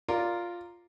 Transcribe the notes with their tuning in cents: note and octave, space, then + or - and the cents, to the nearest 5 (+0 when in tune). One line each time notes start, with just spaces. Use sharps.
F4 +0 A#4 +0 D5 +0